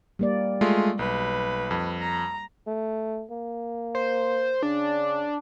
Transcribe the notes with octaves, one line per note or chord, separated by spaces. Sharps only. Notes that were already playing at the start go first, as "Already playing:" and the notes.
G3 A#3 D5
G#3 A3 F4
B1 B4
F2
A#5
A3
A#3
C5
C#3 D4